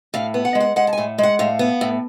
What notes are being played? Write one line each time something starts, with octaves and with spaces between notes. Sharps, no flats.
A2 F5
B3
F#5
G#3
F#5
G#3 F#5
A5
A2 G#5
G#3 F#5
A2 F5
B3
A2